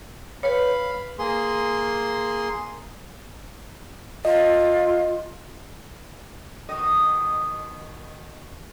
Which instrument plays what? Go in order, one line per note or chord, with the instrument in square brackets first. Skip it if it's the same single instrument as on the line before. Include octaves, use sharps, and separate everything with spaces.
[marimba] B4 C#5 [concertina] F5 B5
[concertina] A#3 G#4 C6
[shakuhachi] F4 [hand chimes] D#5
[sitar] B2 D#3 D#5